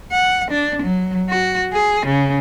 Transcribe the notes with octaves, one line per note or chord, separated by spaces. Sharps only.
F#5
D4
F#3
F#4
G#4
C#3